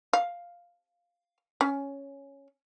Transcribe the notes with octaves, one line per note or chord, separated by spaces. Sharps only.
F5
C#4